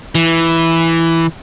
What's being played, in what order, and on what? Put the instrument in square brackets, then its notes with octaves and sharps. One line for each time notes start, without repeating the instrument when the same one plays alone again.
[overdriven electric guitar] E3